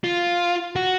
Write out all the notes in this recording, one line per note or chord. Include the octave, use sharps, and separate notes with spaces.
F4
F#4